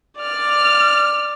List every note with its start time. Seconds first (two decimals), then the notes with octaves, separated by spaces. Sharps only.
0.19 D5 F6